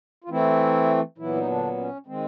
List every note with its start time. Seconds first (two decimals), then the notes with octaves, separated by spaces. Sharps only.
0.24 F4
0.29 E3 A3 C4 E4
1.18 A#2 E3 F#3 B3 E4
1.36 D#4
1.47 D3 D4
1.77 C#4
2.06 D#3 G#3 C4